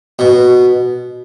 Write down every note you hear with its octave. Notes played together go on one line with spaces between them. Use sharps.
B2